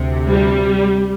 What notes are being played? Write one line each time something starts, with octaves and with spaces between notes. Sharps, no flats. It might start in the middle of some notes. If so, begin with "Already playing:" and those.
Already playing: D2 C3
G3